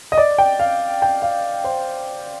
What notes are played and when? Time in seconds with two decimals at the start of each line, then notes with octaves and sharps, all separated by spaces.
0.12 D#5
0.18 D5
0.38 G5
0.59 F5
1.02 G5
1.22 F5
1.64 C5